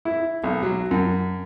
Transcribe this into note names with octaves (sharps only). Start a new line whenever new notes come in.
E4
B1
F#3
F#2